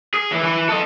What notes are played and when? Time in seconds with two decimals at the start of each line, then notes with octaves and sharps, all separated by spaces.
0.14 G#4
0.32 E3
0.44 E3
0.69 A4 D#5